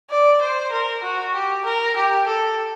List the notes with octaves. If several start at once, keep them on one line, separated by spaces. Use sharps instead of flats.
D5
C5
A#4
F#4
G4
A#4
G4
A4